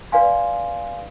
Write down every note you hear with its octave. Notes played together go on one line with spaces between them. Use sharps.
B4 D5 F5 G#5 C6